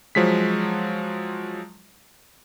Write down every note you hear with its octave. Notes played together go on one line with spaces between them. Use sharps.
F3 F#3 G#3 B6